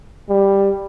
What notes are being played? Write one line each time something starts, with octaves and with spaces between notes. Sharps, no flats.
G3